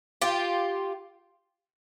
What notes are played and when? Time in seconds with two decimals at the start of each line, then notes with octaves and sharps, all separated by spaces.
0.22 F4 G4